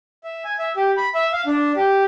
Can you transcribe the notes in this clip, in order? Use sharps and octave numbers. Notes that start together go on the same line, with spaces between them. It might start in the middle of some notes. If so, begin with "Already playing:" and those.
E5
G#5
E5
G4
B5
E5
F5
D4
G4